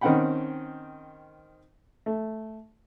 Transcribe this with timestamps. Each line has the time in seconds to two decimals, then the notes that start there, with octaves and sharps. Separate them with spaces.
0.01 D#3 C4 C#4 F#5 G5 B5
2.06 A3